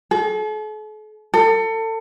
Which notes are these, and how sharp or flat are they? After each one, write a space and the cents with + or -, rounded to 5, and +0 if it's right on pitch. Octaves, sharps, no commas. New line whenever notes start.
A4 -45
A4 +30